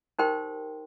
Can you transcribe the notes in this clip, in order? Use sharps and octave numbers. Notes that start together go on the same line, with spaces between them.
D#4 G4 A#4 C5 G5 C6